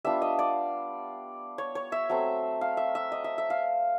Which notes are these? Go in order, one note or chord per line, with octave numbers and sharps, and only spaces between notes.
G3 B3 D4 F4 E5
D#5
D5
C#5
C#5
E5
F#3 A3 C4
F5
E5
E5
D#5
E5
E5
F5